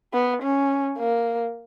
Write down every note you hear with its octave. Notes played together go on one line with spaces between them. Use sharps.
B3
C#4
A#3